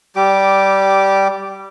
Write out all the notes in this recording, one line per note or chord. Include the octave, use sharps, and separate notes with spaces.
G3 G4 D6